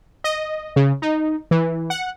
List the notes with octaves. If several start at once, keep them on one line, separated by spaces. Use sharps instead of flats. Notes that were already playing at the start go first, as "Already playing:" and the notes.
D#5
C#3
D#4
E3
F#5